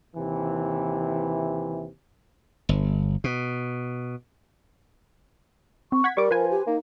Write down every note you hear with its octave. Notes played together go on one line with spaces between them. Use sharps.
D#2 C3 E3
G1
B2
C4 C#6
F#5 G#6 B6
G3 A#4 C#6 D6
F3 B4 C5 G#5
G4
A#3 D#4